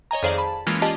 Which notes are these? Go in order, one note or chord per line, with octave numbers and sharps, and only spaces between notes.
C#5 D#5 G#5 A#5
F2 D#3 G#4 C5 D5 F5
A5 B5
E3 G#3 A#3 C#4 F4
F4 G4 D5 D#5 G#5 A5